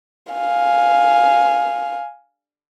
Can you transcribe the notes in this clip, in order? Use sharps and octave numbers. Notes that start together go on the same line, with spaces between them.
F5 G#5